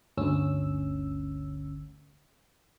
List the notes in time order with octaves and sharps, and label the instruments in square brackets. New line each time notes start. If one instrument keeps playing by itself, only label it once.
[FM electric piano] G1 D2 C#4 E6